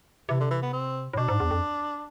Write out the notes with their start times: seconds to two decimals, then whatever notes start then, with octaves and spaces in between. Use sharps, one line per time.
0.29 C3 E3
0.40 D3
0.51 E3
0.62 B3
0.73 C4
1.13 A2
1.17 B2 D4
1.28 G#2
1.40 E2
1.51 F2